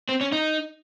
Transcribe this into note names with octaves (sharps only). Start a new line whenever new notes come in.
C4
C#4
D#4